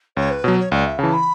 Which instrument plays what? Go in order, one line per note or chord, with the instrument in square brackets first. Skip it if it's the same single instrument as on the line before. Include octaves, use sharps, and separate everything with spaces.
[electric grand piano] C#2 [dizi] C#5
[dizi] B4
[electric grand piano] B2 F#3 [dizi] C#5
[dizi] C#5
[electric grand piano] C#2 [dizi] D5
[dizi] E5
[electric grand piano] C#3 E3 [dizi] A5
[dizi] B5